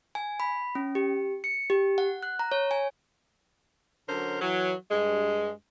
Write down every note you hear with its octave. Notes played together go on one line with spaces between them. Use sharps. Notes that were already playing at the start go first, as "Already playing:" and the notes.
G#5
B5
C#4
G4
C#7
G4
F#5
F#6
A#5
C#5
G#5
D3 F#3 C#4 A#4 C5
E3 F#3
G2 G#3